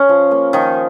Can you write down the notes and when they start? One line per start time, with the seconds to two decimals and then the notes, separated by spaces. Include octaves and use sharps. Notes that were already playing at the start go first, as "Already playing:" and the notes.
Already playing: C#4
0.09 F3
0.31 A#3
0.53 D#3 F3 D#4